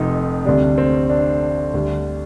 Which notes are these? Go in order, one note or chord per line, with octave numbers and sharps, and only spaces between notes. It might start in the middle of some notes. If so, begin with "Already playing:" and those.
Already playing: F1 F2 C3 D#4
D2 C3 G3 D4
C4
D4
D2 D3 G3